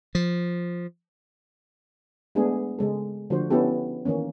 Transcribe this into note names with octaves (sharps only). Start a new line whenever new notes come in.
F3
G#3 A3 B3 D4 G#4
C#3 G#3 A4
D3 F3 A3 F#4 C5
B3 C#4 D4 E4 G4 A4
D#3 E3 A#3 C#4